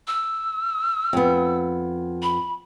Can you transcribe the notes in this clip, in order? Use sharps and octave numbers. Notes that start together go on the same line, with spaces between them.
E6
F2 B3
B5